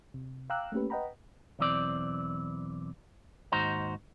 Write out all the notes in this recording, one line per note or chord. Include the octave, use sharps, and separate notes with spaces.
C3
F5 G5 A#5 D6 E6 F#6
A3 A#3 C#4 G4 B4
B4 D#5 F#5 G5 A#5 B5
B1 E2 E3 C4 D5
D#2 G#2 D#4 F#4 C5 A#5